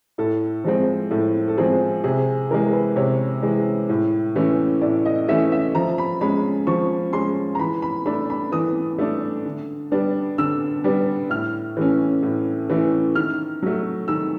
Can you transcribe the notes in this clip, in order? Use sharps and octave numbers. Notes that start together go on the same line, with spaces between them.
A2 A4
F3 G#3 C4
A2 A4
A4
F3 G#3 C4 G#4
C3 G#4
E3 G#3 A#4
B4
C3 C#5
E3 G#3
A2
E3 A3 C#4
A2 D5
D#5
E3 A3 C#4 E5
E5
F3 A#5
B5
G#3 C#4 B5
F3 C#6
G#3 C#4 C6
A#5
E3 B5
B5
A3 D4 B5
B5
E3 D#6
A3 D4
D3
G3 B3 D4
D3 E6
G3 B3 D4
A2 F6
E3 A3 C#4
A2
E3 A3 C#4
D#3 F6
F#3 A3
D#3 E6